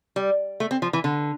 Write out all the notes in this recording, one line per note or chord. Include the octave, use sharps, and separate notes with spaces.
G3
A3
C4
F3
E3
D3